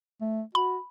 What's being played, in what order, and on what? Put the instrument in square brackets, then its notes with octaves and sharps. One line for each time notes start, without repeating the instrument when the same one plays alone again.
[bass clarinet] A3
[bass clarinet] F#4 [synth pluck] B5